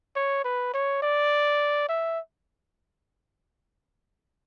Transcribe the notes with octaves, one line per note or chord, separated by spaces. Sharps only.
C#5
B4
C#5
D5
E5